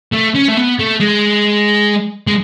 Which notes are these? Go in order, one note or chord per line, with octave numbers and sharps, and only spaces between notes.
A3
C#4
A3
B3
A3
G#3
G#3